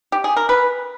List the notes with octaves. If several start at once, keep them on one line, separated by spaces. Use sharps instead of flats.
G4
G#4
A#4
B4